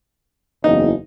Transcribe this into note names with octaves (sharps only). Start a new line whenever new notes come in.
F#1 E2 D#4